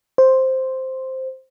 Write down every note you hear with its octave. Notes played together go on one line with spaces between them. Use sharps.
C5